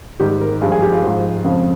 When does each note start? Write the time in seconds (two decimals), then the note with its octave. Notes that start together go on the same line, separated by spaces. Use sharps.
0.20 G#2 D#3 G3 G4
0.41 A#4
0.61 G2 G#4
0.64 F3
0.72 G#4
0.82 G4
0.92 F4
1.03 G#2 F3
1.44 F2 C#3 F3